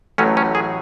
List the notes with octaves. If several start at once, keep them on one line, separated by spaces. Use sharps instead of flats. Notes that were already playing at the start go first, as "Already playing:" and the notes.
A1 A2 F#3 A3 C#4
C#4
G#4